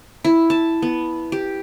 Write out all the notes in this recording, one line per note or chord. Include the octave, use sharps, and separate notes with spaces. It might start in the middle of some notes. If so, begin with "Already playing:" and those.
E4
A5
B3
G4